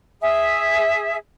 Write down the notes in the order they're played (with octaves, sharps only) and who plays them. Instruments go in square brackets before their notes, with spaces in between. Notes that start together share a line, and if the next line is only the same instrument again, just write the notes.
[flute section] G#4 E5